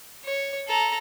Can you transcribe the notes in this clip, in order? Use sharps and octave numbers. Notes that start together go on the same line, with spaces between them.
C#5
A4 A#5